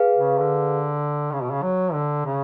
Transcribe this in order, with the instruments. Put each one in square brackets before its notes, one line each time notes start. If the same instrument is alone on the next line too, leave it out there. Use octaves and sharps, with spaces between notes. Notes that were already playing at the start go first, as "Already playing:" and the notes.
Already playing: [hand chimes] G#4 B4 F5
[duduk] C#3
D3
C#3
B2
C#3
F#3
D3
C#3